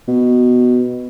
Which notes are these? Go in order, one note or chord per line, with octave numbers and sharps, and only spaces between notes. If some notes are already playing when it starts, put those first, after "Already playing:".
B2